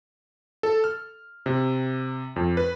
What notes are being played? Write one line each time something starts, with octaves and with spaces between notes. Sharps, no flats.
A4
F6
C3
F2
B4